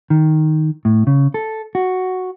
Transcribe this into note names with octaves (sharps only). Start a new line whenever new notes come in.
D#3
A2
C#3
A4
F#4